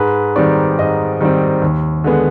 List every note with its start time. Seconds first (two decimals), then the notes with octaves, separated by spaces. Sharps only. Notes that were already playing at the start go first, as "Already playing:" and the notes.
Already playing: G#2 B4
0.36 D#3 G3 C4 D5
0.79 G#2 D#5
1.21 D#3 G3 C4
1.62 D#2
2.04 D3 G#3 B3